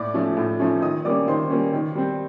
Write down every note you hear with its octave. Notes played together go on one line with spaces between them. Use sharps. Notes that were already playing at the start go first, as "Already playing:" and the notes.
Already playing: A2 D5 D6
F3 A3 C#4
A2
F3 A3 C#4
D#3 D#5 D#6
G3 A#3 C#4 D5 D6
D#3 C5 C6
G3 A#3 C#4
D#3
G3 C4